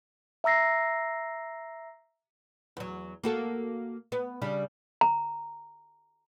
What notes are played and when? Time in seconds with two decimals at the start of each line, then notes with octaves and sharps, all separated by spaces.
0.44 E5 A#5 E6 A#6 C7
2.77 E2 F#3
3.24 A#3 F#4 A4
4.12 B3
4.42 C#3 G3 D4
5.01 A#5